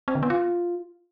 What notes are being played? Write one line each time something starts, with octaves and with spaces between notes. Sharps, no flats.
C4
D3
B3
F4